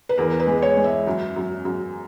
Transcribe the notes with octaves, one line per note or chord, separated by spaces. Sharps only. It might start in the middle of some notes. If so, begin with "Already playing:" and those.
B4
E2 A#4
B4
G#3
C#5
G#3
E5
F#2
F#2
F#2